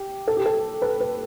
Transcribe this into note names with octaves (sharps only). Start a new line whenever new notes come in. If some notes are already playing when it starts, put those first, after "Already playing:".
Already playing: G4
A4
G4
A4
B4
B4